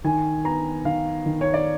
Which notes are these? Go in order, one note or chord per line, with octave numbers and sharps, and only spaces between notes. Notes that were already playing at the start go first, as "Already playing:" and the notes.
D#3 G#5
B3 A#5
D#3 F5
D#3
C#5
D5